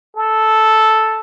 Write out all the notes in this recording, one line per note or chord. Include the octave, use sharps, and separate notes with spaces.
A4